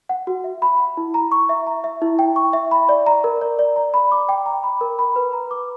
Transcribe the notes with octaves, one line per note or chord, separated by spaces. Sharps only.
F#5
F#4
E5
B5
F#5
E4
A#5
C#6
E5
A#5
E5
E4
G5
C#6
E5
B5
D5
A#5
A#4
D5
D5
A#5
B5
D6
G5
A#5
B5
A#4
B5
B4
A#5
D6